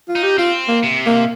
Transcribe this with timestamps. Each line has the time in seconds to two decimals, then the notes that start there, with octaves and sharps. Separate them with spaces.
0.08 F4
0.15 D#4
0.23 G4
0.38 C4 F4
0.68 A#3
0.83 C3
1.06 A#3